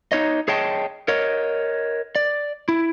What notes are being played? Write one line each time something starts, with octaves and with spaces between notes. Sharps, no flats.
D#4 C#5 D#5
G#4 C#5 D#5 G5 A5
A#4 C#5 D#5
D5
E4